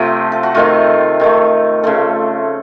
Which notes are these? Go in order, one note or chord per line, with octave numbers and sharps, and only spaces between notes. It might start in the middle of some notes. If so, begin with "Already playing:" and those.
Already playing: C3 F3 A3 F4
A4
F#4
C3 D#3 A3 F4
C3 D#3 A3
C#3 F3 A3 A4